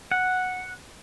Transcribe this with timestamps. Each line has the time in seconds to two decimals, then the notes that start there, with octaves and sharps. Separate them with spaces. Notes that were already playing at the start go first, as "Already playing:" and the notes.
0.11 F#5